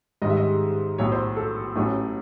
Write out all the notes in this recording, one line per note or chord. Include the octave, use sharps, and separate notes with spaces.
G#2 D#3 G3 D#5
E5
D#5
B1 A2 F#3 C#5
C5
A4
A1 A2 F#3 A3 C#4